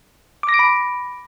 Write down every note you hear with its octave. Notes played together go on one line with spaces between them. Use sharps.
D6
A#6
D7
B5